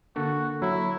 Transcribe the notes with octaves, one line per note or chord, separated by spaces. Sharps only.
D3 A#3 D4 F#4 A4
F#3 E4